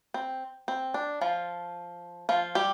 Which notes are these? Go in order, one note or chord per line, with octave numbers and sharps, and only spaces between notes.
C4
C4
D4
F3 F4
F3 F4
G3 G4